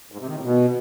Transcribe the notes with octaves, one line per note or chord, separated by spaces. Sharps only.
G#2
C3
D#3
A2
B2